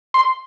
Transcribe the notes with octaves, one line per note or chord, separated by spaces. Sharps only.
C6